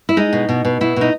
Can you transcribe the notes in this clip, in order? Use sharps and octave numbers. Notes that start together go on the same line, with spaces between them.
E4
G#3 D#4
B2
B2
B2
B2 E4
B2 D#4